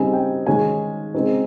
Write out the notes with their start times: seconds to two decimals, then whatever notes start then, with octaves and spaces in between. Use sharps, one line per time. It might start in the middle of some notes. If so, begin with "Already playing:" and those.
Already playing: C#3 G3 C4 D#4 G#5
0.13 G5
0.46 D#3 G#3 C#4 G#5
1.15 C#3 G#3 C4 D#4